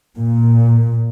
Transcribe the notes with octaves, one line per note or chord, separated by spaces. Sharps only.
A#2